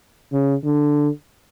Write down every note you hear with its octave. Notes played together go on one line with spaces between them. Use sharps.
C#3
D3